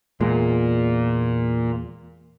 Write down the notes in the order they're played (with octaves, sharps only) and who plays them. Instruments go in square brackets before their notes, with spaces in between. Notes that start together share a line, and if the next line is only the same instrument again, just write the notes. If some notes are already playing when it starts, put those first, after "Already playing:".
[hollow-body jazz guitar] E2 G#3 [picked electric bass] A#2